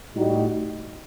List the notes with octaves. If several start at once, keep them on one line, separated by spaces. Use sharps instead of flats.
A2 G3 D#4 F#4